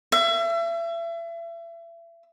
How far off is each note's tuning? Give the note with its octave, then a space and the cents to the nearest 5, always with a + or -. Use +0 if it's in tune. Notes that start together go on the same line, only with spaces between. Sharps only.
E5 +35